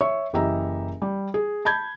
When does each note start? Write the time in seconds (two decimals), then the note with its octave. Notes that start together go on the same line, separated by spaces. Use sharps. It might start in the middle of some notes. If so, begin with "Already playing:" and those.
0.01 C#5 E5 C#6
0.33 F#1 E3 G4 D#5 E5 A#5
1.02 G3
1.34 G#4
1.65 A5 B5 G6 G#6